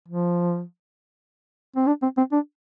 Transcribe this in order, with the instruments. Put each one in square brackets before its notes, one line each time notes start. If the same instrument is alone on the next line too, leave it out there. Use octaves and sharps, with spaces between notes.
[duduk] F3
C4
D4
C4
C4
D4